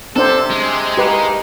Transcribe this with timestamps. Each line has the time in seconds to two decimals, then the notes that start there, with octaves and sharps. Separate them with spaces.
0.16 C3 C4 D4 A4 C5
0.50 G#3
0.97 D2 A#3 D#4 G4 B4